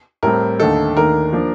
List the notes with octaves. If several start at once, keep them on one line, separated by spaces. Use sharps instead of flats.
A2 G3 C4 A#4
D#2 D3 A3 D#4 A4
D#2 D#3 A3 D4 A#4
F3 A#3 D4